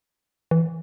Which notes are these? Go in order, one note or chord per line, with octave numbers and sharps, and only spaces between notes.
E3